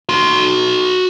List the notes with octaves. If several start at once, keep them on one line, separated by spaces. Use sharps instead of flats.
F#4 C6